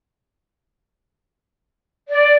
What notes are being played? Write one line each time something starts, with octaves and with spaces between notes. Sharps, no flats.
D5